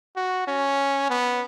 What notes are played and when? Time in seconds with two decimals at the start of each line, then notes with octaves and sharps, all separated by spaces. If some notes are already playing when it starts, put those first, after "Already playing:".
0.16 F#4
0.48 C#4
1.10 B3